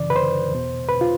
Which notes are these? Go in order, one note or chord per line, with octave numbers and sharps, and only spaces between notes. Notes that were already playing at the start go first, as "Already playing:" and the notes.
Already playing: F#2 C#3 E3 D5
B4
C5
E2 B2
B4
F4